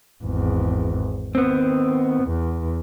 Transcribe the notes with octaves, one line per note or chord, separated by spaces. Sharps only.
G#1 E2
D#3 B3 C4
E2